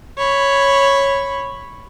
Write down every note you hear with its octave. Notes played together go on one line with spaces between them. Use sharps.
C#5 B5